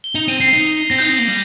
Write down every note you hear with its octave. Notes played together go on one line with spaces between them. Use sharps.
G7
D#4 F7
C4 D#7
C4 C7
D#4
C4 A#6
D#4 G6
C4 A#6
A#3
G3